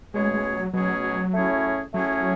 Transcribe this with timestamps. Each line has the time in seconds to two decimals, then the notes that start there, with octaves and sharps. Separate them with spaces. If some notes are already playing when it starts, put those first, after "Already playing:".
0.14 B2 G#3 A3 C#4 G#4 C#5
0.34 G#3
0.54 F#3
0.74 B2 F#3 A3 C#4 G#4 C#5
1.04 F#3
1.34 A3 C#4 E4 G#4 C#5
1.94 F#3 A3 C#4 E4 G#4 C#5